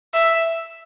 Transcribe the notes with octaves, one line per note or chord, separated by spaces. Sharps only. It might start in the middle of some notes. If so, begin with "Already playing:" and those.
E5